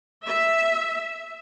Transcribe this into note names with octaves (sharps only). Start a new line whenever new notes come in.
E5